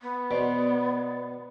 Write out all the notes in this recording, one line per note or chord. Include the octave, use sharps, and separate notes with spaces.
B3
B2 C5 D5